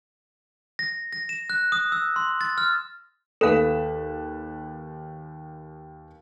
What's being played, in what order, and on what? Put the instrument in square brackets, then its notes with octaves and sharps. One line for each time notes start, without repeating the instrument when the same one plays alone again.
[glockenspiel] A#6
A#6
E7
F#6
D#6
E6
C6
A6
F6
[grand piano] D#2 B4 E7 [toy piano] A4 F5